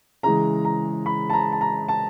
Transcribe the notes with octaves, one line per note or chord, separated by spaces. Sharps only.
C#3 E3 G#3 A#5
A#5
B5
A5
A#5
A5
A#5
A5